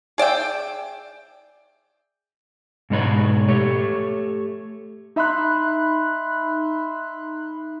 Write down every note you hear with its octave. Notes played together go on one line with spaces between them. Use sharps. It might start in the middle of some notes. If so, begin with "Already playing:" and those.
G#4 D5 E5 G5
G#2 B2 G#3 D#4 B4 C#5
A3 G4 C#5
D#4 E5 B5 C6 F#6